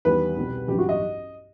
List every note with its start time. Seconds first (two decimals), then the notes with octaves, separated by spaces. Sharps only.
0.05 E2 D#3 G3 B4
0.36 C2 B2 G3
0.68 A1 G2 F#3 G4
0.79 F#4
0.89 D#5